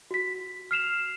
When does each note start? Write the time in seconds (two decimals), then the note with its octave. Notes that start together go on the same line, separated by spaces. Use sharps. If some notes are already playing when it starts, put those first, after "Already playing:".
0.11 F#4 B6
0.71 F6 C7 E7 F7